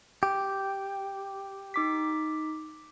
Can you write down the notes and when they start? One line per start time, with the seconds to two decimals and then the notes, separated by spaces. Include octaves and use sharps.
0.23 G4
1.74 D#4 D6 B6